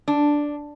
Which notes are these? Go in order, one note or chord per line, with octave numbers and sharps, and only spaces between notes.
D4